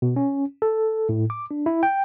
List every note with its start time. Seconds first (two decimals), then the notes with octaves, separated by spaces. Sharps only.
0.02 B2
0.16 C#4
0.62 A4
1.09 A2
1.30 D6
1.51 D4
1.66 E4
1.83 G5